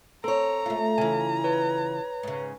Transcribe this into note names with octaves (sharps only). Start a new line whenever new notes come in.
C4 A4 C#5 A#5
A3 F4
C#3 E3 G#5
B4 C#5
G#2 C#3